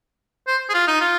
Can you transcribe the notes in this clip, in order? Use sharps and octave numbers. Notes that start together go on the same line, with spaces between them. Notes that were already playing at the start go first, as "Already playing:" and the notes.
C5
G#4
F4
D#4
F4